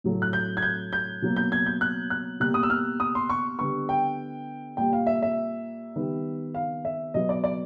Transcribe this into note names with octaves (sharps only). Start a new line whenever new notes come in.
A2 F#3 A3
F#6
G6
G#6
G6
G6
B2 F#3 A#3
G6
G#6
G6
F#6
F#6
B2 G3 A#3 F#6
D#6
E6
F6
D#6
C6
C#6
D3 G3 B3 C#6
G5
A#2 G3 A#3 G5
F5
E5
E5
D#3 G3 B3
F5
E5
B2 F#3 B3 D#5
D5
D5